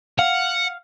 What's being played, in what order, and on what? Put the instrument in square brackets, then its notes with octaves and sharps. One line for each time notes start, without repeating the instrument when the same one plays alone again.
[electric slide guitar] F5 [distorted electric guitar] F#5